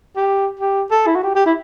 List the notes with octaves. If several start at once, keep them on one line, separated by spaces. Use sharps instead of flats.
G4
G4
A4
E4
F#4
G4
G4
E4